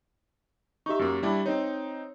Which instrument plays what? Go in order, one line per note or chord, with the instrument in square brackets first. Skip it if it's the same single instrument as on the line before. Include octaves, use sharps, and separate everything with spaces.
[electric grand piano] D#4 E5 [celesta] G4 C#6
[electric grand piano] F#2 A#3
G3 D4 E4
[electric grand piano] C4 D#4 [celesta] C#5